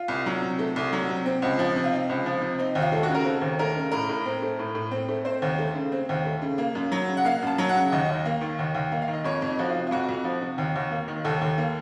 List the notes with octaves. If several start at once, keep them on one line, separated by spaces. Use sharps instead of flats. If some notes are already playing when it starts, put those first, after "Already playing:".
Already playing: F4
C2
F#3
C3
A3
C2
F#3
C3
C4
C#2
F3
C3
F4
C4 D#4
C#2
F3
C3
C4 D#4
D#2 D#4
F4
A3 A4
F#4
C#3
A#4
C4 A4
D#2
A3 A#4
C#3
A2 A#4
A2
C4
A3
A2
A2
C4
A3
C4 C5
D#2
A3
C#3
C4
D#2
A3
C#3
A#3
F#2
F#3
C#3
F#5
A#3 F5
F#2 A5
F#3
F#5
C#3
D#2 D#5
D#2
A#3
D#3
D#2
D#2
A#3
F5
D#3
D#5
F2 C#5
F2
D#4
F3 F#4
F4
C3
F4
F2 F#4
F2
F3
C3
D#2
D#2
A#3
D#3
D#2 A4
D#2
A#3